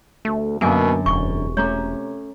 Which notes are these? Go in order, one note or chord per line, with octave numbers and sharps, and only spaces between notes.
D2 A3
F#2 B2 D3 A#3 A#4 G#5 D6
E1 C3 C#6
A3 C#4 C#5 A#5 D6